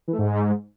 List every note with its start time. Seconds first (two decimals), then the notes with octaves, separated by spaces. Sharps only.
0.08 E3
0.13 A3
0.18 G#2